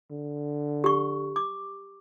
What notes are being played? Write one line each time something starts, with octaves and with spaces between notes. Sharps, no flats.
D3
G4 C#6
D6